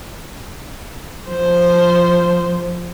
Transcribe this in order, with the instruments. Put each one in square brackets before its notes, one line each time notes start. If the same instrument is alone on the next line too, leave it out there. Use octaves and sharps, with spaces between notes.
[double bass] F3 [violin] C5